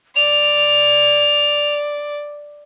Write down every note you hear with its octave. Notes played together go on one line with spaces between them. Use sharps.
D5 F7